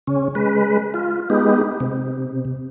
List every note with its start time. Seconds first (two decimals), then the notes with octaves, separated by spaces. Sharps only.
0.07 C#3 C#4
0.35 G#3 B4
0.94 F4
1.30 G#3 B3 D#4 G4
1.80 C3